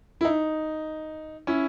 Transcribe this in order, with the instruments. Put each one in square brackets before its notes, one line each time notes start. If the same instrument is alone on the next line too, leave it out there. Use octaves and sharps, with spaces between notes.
[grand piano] E4
D#4
C#4 E4